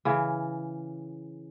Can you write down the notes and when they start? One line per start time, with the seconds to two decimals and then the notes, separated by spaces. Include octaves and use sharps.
0.05 C#3 E3